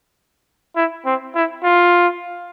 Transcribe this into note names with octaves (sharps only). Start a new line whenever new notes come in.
E4
C4
E4
F4